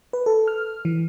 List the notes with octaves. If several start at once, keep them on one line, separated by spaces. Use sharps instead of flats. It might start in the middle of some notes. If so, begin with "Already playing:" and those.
B4
A4
F6
E3